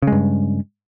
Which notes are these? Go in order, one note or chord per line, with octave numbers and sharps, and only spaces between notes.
G2 C#3 G#3